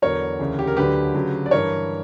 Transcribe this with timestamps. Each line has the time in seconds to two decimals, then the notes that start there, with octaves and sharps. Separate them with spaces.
0.02 E2 D3 F#3 A#4 C#5
0.39 D2 C#3 E3
0.59 G4
0.67 A#4
0.77 D2 D3 F#3 G4 B4
1.14 D2 C#3 F#3
1.46 D5
1.51 G2 E3 A#4 C#5